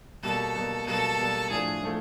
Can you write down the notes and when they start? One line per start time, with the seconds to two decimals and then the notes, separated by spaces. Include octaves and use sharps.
0.23 B2 G3 A#3 A4
0.55 B2 G3 A#3
0.87 B2 G3 A#3 A4
1.19 B2 G3 A#3
1.50 A2 F3 A3 D4 G#4
1.83 A2 F3 A3